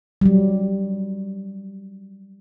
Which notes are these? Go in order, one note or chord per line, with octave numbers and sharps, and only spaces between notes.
F#3 G3